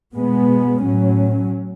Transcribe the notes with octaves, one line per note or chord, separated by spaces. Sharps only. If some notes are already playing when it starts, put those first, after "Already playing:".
B2 G#3 B3
A2 F#3 C#4